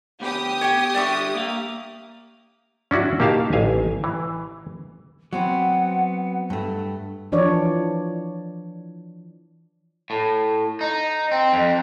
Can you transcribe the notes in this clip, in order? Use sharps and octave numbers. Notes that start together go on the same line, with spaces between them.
D2 B3 G4 D#6
C#5 G5
D3 G3 D5 E5 C#6
A#3 F5
C#4 D4 E4 F#4
A#3 D#4 G4 E5 F5 A5
A1 F5 G#5
E3
F#3 B3 C4 F#5
G2 A3
E3 F3 D4 C#5 D5
A2
D#4
C4
F2